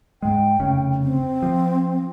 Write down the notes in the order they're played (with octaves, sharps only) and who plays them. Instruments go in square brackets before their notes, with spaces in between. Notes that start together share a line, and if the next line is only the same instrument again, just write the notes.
[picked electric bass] G#2 G#3 [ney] G5
[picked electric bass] F1 C#3
[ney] C4
[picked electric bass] F3